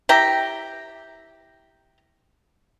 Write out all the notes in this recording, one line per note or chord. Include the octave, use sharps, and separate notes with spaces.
E4 G4 A#5